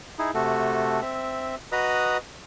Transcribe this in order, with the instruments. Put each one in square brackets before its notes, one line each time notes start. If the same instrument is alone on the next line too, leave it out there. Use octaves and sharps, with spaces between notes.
[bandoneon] D#4 E4 G#4
C3 A3 F#4 A4
C4 E5
F#4 B4 D#5 A#5 B5 D#6